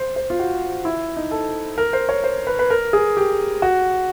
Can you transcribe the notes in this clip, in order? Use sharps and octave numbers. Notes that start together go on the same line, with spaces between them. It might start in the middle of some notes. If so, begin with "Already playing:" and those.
Already playing: C5
C5
F4
F#4
E4
D#4
A4
A#4
C5
C#5
C5
B4
B4
A#4
G#4
G4
F#4